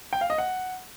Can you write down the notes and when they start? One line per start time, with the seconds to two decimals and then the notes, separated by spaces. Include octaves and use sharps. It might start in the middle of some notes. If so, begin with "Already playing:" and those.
0.13 G5
0.21 F5
0.30 D#5
0.38 F#5